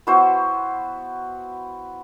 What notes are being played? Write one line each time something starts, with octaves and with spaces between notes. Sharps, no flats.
B3 E4 F#4 C5